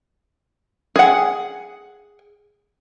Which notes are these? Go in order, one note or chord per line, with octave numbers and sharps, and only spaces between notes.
G#4 F#5